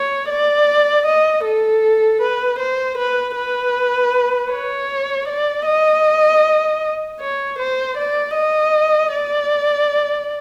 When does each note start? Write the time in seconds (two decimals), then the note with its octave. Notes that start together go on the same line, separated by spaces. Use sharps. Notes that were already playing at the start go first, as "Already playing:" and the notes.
Already playing: C#5
0.29 D5
1.06 D#5
1.45 A4
2.21 B4
2.59 C5
2.98 B4
3.36 B4
4.52 C#5
5.28 D5
5.66 D#5
7.20 C#5
7.59 C5
7.97 D5
8.35 D#5
9.12 D5